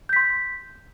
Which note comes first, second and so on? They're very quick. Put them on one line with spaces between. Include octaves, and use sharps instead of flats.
G6 B6 C6